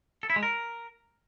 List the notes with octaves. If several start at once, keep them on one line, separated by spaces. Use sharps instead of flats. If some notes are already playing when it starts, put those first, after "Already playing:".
A4
E4
G#3
A#4